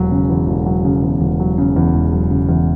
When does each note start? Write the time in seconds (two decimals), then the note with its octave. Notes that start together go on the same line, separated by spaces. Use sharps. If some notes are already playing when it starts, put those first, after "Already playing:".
Already playing: E1 F#3
0.12 C#3
0.30 E2
0.47 E1
0.66 F#3
0.85 C#3
1.03 E2
1.21 E1
1.40 F#3
1.58 C#3
1.76 E2
1.94 E1
2.12 F#3
2.31 C#3
2.49 E2